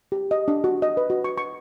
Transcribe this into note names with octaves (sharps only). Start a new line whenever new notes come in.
G4
D#5
D4
F#4
D#5
B4
F#4
C#6
C#6